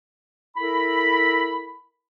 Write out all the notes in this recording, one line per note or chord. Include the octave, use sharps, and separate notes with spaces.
E4 A4 A#4 B5